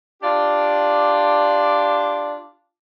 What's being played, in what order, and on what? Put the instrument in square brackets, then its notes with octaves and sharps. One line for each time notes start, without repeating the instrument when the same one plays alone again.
[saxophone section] D4 F4 G4 D5